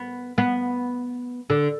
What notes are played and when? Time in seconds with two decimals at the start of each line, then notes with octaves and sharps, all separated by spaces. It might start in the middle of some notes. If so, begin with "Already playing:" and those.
Already playing: B3
0.38 B3
1.50 D3